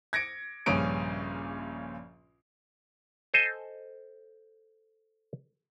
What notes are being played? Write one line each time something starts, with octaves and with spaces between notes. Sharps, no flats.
G#6 A#6 C#7 D7
A#1 G2 C#3 C#4 D#6 D7
A4 C5 D#5 G#5